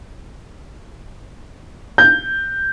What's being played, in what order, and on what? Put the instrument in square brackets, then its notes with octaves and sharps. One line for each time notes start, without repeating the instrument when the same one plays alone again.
[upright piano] G6